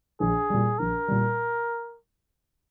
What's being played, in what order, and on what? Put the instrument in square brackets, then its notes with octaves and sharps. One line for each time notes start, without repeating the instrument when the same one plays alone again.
[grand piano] A#1 [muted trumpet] G#4
[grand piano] A#2 G3
[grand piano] A#1 [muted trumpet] A#4
[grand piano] A#2 G3